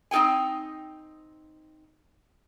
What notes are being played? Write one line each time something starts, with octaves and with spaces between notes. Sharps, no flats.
C4 D#4 A4 G5 G#5